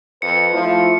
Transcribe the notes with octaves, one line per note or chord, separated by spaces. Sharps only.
F2 B4 C#7
F3 A3 E4 F4